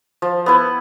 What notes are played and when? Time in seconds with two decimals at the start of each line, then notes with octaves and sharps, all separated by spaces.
0.22 F3
0.46 B3 E4 B4